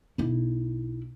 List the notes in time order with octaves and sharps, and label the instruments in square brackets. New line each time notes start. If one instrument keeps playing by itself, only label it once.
[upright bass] B1 E4